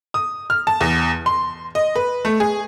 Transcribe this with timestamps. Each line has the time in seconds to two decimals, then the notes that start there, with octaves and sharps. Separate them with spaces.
0.14 D#6
0.50 F6
0.67 A5
0.81 E2
1.26 C6
1.75 D#5
1.96 B4
2.25 A3
2.40 G#4